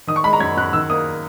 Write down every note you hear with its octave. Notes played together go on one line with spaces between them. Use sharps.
D#3 D#6
C#6
G#3 B5
A#5
F#2 G#6
F#2 F#6
D#3 E6
A#3 D#6